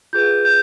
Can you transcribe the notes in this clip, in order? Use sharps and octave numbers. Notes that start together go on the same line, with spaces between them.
F4 G#4 B4 G6
G6